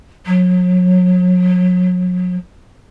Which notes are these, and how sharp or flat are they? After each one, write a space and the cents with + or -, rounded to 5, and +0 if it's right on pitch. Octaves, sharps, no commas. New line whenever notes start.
F#3 -35